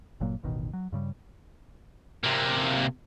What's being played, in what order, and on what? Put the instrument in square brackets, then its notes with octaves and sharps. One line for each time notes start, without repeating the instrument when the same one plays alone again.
[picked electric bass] G1 A#2 F#3 A#3
E1 A1 B2 D#3
F#3
G2 C#3 G3
[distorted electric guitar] C3 A#3